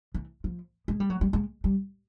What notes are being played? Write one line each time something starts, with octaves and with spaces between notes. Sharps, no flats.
E3
F3
G#3
G3
F#3
G3
G#3
G3